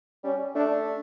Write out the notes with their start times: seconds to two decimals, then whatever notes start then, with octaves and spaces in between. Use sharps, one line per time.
0.24 G3 C#4
0.55 A3 D4